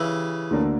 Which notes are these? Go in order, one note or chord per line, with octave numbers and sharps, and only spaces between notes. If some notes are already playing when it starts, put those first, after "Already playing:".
Already playing: C#3 E3 G4
D2 D3 A#3 D4 A#4